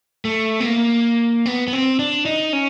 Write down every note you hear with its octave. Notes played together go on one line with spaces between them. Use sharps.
A3
B3
A#3
B3
B3
C4
D4
D#4
C#4